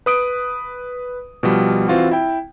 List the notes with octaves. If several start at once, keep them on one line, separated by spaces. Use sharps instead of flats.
B4 D#6 D7
B2 F3 G3
E3 C4 F4 F#4
E4 G5